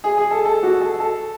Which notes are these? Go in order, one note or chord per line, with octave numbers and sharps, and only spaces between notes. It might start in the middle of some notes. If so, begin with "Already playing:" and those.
G#4
G#4
A4
A4
F#4
A4
A4